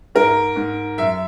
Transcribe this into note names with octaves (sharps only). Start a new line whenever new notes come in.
G#2 A#4
G#2
F#2 E5